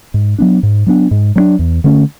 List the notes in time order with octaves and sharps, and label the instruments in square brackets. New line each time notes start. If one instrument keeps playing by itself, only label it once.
[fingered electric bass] G#2
F#3 B3 D4
G#2
F#3 B3 D4
G#2
F#3 B3 D4
E2
D3 A3 C#4